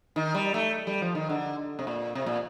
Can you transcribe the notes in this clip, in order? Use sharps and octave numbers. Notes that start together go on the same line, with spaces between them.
D#3
G3
A3
G3
F3
D#3
D3
C3
A#2
C3
A#2